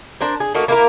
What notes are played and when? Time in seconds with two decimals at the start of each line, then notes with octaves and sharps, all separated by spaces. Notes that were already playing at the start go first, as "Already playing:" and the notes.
0.21 D4 A#4 C5
0.40 G#4
0.54 A3 A#3 D#4 F#4
0.68 A#3 E4 A#4